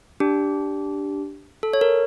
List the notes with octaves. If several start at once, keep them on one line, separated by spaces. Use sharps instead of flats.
D4 G4
A4
C#5
A#4